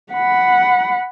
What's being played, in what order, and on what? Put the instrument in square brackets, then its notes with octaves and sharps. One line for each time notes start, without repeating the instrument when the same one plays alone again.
[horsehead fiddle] F#5 B5